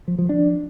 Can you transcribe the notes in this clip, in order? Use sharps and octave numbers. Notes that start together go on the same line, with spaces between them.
F3
F3
D4